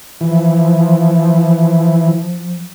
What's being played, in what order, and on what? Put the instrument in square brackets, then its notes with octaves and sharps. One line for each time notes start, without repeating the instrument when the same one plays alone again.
[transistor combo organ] E3 [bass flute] F3